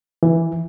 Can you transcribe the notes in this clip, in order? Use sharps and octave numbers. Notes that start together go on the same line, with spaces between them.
E3